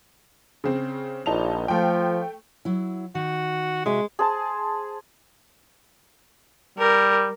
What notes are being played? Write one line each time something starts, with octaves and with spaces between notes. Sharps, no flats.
C#3 C4
A#1 D#4 A5 F7
F3 A3 G5
F#3 E4
D#3 F#4
C3 G#3 F#4 E5
G#4 C5 A5
G3 A#4